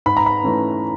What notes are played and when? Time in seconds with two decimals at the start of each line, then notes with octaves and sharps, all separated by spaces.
0.06 G#2 B5
0.17 A#5
0.26 B5
0.43 E3 A3 C#4